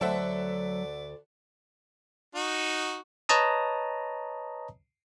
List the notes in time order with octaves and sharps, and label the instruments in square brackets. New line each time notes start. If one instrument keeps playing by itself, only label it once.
[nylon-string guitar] D2 C5 A5 [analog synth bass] F#3 [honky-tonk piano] A4 E5 F#5 [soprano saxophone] D5
[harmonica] D#4 F#4
[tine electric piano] B4 C#5 D#5 A5 A#5 D#6